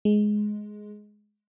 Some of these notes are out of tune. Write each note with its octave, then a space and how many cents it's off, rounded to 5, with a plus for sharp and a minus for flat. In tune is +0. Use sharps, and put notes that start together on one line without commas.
G#3 +10